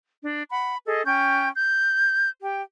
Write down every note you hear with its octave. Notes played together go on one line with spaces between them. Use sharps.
D4
F#5 B5
G#4 A4 D#5
C#4 G5 G6
G6
G4 G5